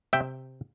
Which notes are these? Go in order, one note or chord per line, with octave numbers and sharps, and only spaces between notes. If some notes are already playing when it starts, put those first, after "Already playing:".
C3 E5 G5